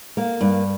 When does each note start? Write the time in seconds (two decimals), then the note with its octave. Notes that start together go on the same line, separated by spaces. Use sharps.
0.17 A#3
0.41 G2